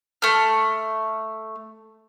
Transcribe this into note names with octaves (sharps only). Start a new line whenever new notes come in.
A3 F6